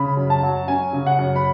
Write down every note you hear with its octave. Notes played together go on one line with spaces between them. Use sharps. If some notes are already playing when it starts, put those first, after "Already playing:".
Already playing: C#3 B5
F#2
A5
F#3
C#4 G#5
C#3
F#5
F#2
B5